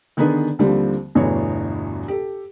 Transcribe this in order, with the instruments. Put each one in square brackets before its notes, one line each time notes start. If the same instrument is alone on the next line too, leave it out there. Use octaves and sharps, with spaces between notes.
[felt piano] D3 D#3 B3 D4 G#4 B4
D#2 D3 F3 G3 C4
G1 E2 B2 E3 A3 C#5
G4 A4